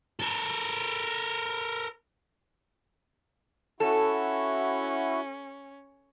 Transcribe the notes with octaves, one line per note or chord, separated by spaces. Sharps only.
A4 A#4
C#4 E4 F#4 A4